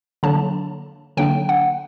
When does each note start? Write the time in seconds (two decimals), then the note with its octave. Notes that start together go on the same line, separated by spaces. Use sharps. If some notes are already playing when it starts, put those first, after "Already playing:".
0.23 D3 F#3 A#3 D4 A5
1.17 D3 F#3 A#3 D4 G5
1.49 F#5